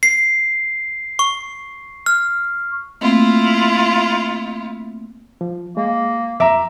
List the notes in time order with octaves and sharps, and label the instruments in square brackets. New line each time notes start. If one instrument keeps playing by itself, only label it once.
[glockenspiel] C7
C#6
F6
[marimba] A3 A#3 C4 [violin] E4 F4
[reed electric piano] F3
[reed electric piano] G#3 [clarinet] A#3
[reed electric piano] F2 D6 [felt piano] E5 A#5